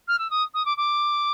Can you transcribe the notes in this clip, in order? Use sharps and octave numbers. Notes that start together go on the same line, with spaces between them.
F6
E6
D#6
D#6
D6
D6